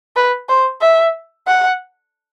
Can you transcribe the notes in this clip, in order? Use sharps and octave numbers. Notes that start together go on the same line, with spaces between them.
B4
C5
E5
F#5